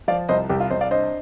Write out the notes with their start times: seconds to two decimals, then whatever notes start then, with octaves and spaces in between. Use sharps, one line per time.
0.08 F3 D5 F5
0.29 C2 C5 D#5
0.49 C2 G4
0.60 F4
0.70 C2 C5 D#5
0.81 D5 F5
0.91 D4 C5 D#5